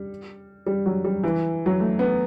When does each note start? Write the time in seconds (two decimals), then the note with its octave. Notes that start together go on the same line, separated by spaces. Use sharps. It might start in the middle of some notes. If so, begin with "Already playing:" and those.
Already playing: G3
0.66 G3
0.86 F#3
1.04 G3
1.23 E3
1.66 F#3
1.80 A3
1.99 B3